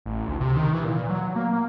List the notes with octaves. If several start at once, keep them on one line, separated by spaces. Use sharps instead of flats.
A1
D2
C3
D#3
E3
A#2
F#3
A#3
A#3